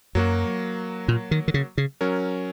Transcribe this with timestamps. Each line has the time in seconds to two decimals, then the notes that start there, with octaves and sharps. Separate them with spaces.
0.15 F#2 F#3 A#3 F#4
1.08 A#2
1.31 D#3
1.48 D#3
1.54 C#3
1.78 C#3
2.01 F#3 C#4 A#4